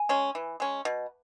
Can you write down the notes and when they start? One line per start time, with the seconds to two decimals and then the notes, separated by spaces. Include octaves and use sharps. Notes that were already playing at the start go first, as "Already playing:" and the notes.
Already playing: G#5
0.09 G#3 C#4
0.35 E3
0.60 G#3 C#4
0.85 B2